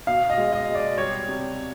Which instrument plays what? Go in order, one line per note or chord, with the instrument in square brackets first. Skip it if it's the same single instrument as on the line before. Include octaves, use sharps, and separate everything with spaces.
[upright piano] B2 F5
D#5
G#3
D#5
B2
D5
G3 C#5
C3